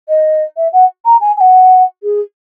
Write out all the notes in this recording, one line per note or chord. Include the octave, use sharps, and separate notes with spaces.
D#5
E5
F#5
A#5
G#5
G#5
F#5
G#4